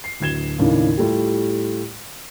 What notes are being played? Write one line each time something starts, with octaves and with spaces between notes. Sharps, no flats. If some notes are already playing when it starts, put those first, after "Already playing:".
C7
D1 D2 G#6 E7 G7
D#2 A2 C#3 D4 D#4
A2 G3 A3 F4 G4